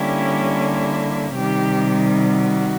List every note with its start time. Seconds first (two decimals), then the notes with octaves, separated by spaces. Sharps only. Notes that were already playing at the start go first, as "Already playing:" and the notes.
Already playing: D3 G3 A#3 C#4 E4 G4
1.34 C3 D#3 G3 G4
2.22 F#4